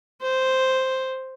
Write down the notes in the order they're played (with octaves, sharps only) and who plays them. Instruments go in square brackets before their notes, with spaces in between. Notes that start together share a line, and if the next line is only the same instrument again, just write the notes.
[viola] C5